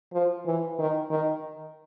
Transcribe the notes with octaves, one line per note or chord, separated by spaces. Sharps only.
F3
E3
D#3
D#3